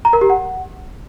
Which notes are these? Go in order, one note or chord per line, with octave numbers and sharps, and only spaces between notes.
A#5
A#4
G4
F#5